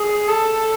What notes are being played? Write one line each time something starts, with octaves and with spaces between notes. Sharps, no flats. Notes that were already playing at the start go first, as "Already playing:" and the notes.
Already playing: G#4
A4